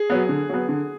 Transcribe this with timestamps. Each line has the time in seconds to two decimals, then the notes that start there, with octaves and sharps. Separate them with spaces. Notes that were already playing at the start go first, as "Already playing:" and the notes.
Already playing: G#4
0.10 F#3 B3
0.29 D3
0.49 F#3 B3
0.69 D3